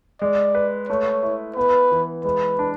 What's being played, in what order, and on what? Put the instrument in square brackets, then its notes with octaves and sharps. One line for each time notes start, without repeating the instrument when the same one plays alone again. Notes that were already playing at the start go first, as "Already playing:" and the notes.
[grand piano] G#3 [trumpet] D5
[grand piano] B4
[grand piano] A3 [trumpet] C#5
[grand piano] E4
[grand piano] B3 [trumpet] B4
[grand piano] E3
[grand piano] G#3 [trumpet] B4
[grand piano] D4